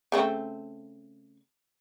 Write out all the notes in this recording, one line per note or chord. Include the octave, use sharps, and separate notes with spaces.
C#3 A3 C4